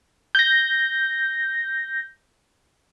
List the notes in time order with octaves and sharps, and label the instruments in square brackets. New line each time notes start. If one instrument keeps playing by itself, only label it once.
[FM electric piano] G6 A#6